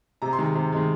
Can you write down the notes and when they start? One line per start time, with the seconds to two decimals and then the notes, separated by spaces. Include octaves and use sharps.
0.22 C3 A#5
0.33 C6
0.39 D#3 G#3
0.55 C3
0.73 D#3 G#3